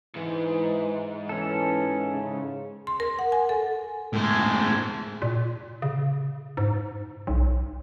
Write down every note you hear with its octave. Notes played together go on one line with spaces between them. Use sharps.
G#2 E3
E3 C#4 A4
C#3
C6
A#4
F#5
G#5
A4
A2 G#3
A#2
C#3
G#2
B1